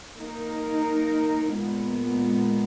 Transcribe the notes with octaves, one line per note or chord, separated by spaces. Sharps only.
A#3 D#4 A#4
A#2 G#3 B3